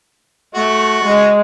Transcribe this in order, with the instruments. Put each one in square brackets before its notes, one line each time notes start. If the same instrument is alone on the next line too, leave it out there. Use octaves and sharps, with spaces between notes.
[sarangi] A3 [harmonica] F#4
[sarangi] G#3